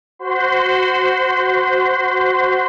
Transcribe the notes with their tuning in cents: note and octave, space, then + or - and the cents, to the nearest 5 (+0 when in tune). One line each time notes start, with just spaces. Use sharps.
F#4 +0 C5 +0 C6 -35